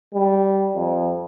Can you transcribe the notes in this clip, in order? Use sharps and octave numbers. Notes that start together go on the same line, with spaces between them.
G3
F2